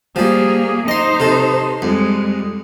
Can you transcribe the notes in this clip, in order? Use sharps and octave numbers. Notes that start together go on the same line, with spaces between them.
F3 G3 A#3 G#4
D#4 C5 D#5 C6
C3 A4
F2 G3 G#3